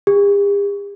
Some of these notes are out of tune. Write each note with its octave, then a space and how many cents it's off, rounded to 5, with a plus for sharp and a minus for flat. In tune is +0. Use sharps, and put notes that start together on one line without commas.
G4 +45